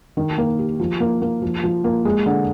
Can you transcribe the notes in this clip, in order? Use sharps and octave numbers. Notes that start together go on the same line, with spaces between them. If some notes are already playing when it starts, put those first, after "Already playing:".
D#3
A#3
G4
F3
A#3
A#3
F3
F3
A#3
G#3
D3